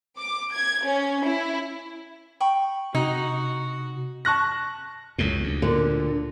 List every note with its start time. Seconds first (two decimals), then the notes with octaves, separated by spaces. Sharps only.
0.18 D6
0.53 G#6
0.86 C#4
1.26 E4
2.40 G5 B5 C#6
2.95 C3 D#4 F#4
4.25 A5 C#6 F#6 A#6
5.18 C#2 F#2 A2
5.44 D2
5.62 A#2 D3